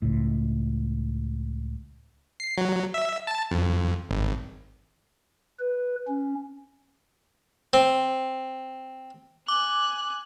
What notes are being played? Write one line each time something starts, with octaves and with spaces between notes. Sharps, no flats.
C#2 A2
C7
F#3
E5
A5
F2
G#1
B4
C#4
C4
G#5 D6 F#6